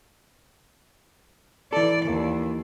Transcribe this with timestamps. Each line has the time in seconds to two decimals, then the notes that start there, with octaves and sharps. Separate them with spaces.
1.73 E3 A4 D5
2.06 D#2